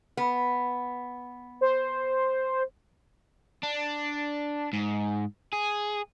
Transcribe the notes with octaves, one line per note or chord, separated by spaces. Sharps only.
B3
C5
D4
G#2
G#4